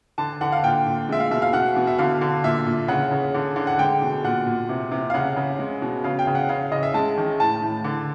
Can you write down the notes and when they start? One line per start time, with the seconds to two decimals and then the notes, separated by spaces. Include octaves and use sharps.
0.18 D3 A5
0.41 D3 F#5
0.52 F5
0.64 A#2 G5
0.87 A#2
1.09 G#3 E5
1.20 F5
1.31 B2 E5
1.42 F5
1.53 B2 F#5
1.76 B2
1.87 E5
1.99 D3 F5
2.21 D3
2.44 A#2 E5
2.66 A#2
2.88 C#3 F#5
3.11 C#3
3.34 D3
3.56 D3
3.67 F#5
3.79 G#3 G5
4.02 B2
4.24 A#2 F#5
4.47 A#2
4.69 C3
4.91 C3
5.10 F5
5.14 C#3 F#5
5.37 C#3
5.59 G#3
5.82 B2
6.04 C#3 F5
6.19 G5
6.27 C#3
6.35 F#5
6.49 C#3 F5
6.72 C#3 D#5
6.83 E5
6.94 G#3 A5
7.18 D#3
7.40 A2 A5
7.62 A2
7.84 D3